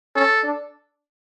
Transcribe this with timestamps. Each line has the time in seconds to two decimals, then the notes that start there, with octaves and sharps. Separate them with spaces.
0.16 C#4 A4
0.44 D4